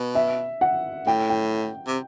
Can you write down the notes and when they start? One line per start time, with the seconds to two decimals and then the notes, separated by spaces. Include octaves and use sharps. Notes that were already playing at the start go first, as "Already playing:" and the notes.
Already playing: B2
0.15 E5
0.61 F#5
1.07 A2 G5
1.30 G5
1.87 C3